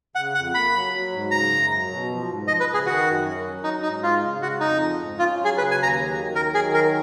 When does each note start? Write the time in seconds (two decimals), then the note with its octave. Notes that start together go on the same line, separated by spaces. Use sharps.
0.15 C#3 F#5
0.35 F2 F#5
0.54 A#3 B5
0.74 F#3
0.93 F#3
1.13 G#2
1.31 C#3 A#5
1.51 F#2
1.70 F#3
1.90 B2
2.09 F3
2.28 G#2
2.47 F3 D#5
2.60 B4
2.67 C#3
2.74 G#4
2.86 D#3 F#4
3.06 F#2
3.25 C#4
3.45 F#3
3.64 F#3 D#4
3.83 G#2 D#4
4.03 G#3 F4
4.22 C#3
4.42 C#3 F#4
4.60 F2 D#4
4.80 F3
4.99 G#2
5.18 C#4 F4
5.38 F#3
5.45 G#4
5.57 C#3 B4
5.71 G#5
5.77 D#2
5.83 A#5
5.96 F#3
6.16 D#3
6.35 F#3 A#4
6.54 D#3 G#4
6.73 F#3 A#4